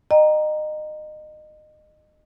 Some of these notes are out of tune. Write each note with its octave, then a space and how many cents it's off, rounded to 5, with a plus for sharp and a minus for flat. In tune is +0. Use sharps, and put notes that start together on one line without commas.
D#5 -25 G5 +0 A#5 +5